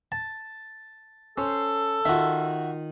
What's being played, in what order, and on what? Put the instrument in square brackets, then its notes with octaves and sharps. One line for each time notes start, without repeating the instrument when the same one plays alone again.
[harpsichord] A5
[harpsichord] C#4 [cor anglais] A4 [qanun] C5
[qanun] D#3 F4 [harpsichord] F#4 E5